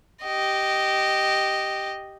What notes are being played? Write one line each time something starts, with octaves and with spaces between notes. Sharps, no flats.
G4 D#5